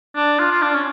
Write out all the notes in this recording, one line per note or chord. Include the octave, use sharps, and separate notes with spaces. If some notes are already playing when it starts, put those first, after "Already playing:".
D4
F4
F4
D4
C#4